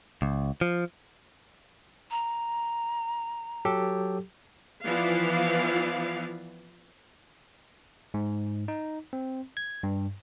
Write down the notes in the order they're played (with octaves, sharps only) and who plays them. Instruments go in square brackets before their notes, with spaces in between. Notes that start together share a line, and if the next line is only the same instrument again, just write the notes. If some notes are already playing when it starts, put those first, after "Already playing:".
[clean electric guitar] C#2
F3
[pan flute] A#5
[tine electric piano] F#3 G4 A4
[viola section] E3 F3 B3 E4 D5 F5
[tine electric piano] G#2
D#4
C4
G#6
G2